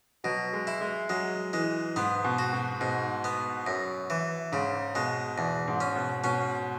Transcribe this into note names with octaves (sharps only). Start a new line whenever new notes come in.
B2 F#3
G#3
E4
G#3
F#3 G#3
E3 G#3
G#2 B3
B2
F#4
B2
G#2 B2
B3
F#2
E3
G#2 C#3
B2 G#3
E2 B2
G#2
C#4
B2
B2 C#4